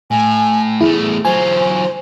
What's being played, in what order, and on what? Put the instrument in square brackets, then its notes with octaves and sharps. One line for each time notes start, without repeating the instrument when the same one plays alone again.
[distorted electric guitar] A2 [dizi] G#5
[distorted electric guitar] E2 A3 [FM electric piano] E4 [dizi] G#4
[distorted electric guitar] F#3 F4 [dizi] C5 [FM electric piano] G#5